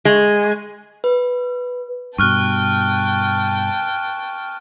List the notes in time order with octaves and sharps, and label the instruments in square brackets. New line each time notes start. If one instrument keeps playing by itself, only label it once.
[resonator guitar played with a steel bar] G#3
[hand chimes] B4
[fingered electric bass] G2 B2 [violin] G5 A5 [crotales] C#6 F6 F#6